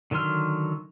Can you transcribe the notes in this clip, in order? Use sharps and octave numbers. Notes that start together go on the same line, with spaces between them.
D3 D#3 F#3 C6 F6